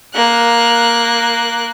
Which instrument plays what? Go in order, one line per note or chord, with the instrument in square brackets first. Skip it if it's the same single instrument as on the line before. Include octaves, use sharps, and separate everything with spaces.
[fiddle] A#3 F#6